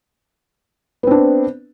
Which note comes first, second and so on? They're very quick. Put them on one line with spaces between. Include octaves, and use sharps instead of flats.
B3 C4 D4